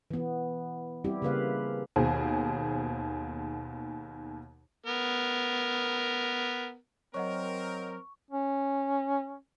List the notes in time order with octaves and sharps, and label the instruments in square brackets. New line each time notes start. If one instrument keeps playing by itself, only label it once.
[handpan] E3 B3
G3 C4 E4 G4
C#3 A#3 B4 F5
[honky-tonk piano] D#2 B2 G#4 C5
[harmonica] B3 A#4
[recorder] F#3 [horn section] C4 A#4 [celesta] C#5 D#5 F#5 [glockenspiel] C#6
[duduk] C#4